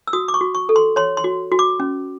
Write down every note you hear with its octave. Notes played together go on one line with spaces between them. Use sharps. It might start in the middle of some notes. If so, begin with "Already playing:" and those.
E6
F#4 D#6
D6
C#6
F#4
C#6
A4
C6
C#5 C6
C6
F#4
F#4
D6
C#4